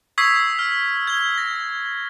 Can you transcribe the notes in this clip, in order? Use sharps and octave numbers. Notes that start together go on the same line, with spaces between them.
C#6 D#6 E6 G#6 B6 C7
F6
G#6 G7
A#6